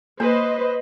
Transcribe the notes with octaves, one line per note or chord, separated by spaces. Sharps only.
A#3 B4 C5 D#5